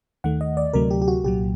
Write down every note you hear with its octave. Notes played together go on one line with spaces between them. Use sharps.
D#2 D#3 A3 F#5
D#5
D5
D2 C3 F#3 A3 A#4
G4
G4
F#4
C2 A#2 F#3 G4